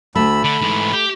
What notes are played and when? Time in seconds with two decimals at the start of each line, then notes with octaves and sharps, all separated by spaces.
0.15 D2 A3 B5 E6
0.44 D3 B5
0.61 G#2 E3
0.93 G4